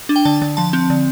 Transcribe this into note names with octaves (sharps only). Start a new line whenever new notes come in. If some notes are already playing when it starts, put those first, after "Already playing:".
D4
G5
D3 A5
D3
F3 A5
C4
D3